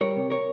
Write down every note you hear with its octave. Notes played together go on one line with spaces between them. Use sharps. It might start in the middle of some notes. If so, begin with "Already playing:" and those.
G3 A#4 C#5
C3
A#4 C#5